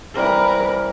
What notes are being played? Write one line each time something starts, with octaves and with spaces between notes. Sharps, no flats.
C3 E3 G3 A#4 B4